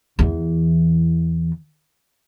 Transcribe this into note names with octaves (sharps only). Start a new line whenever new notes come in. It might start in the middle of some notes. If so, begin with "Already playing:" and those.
E2 E3